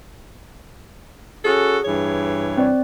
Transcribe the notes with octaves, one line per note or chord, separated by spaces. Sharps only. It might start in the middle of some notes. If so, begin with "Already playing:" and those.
C#4 F#4 G#4 A4
G2 E3 C#5
C4 D5